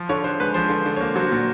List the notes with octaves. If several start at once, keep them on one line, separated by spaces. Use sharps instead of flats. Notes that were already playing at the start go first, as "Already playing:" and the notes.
Already playing: F3
D3 C#5
D3 C5
G#3 B4
F3 C5
D3
D3
A#3 C#5
F#3 C5
A#2